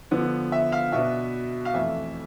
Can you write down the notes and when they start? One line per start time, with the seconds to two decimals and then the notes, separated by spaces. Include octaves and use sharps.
0.11 D3 F3 B3
0.52 E5
0.72 F5
0.92 B2 B3 D4 E5
1.65 F5
1.73 F2 E3 A3 E5